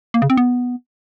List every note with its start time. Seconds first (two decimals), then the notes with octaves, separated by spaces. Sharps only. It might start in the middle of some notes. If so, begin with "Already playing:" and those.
0.14 A#3
0.22 C#3
0.30 C4
0.37 B3